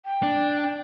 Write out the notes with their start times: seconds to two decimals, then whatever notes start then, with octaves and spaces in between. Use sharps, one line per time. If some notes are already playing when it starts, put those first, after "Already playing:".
0.05 G5
0.23 D4